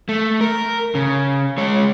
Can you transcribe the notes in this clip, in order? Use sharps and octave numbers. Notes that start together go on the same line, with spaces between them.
A3
A#4
C#3
G#3 C#5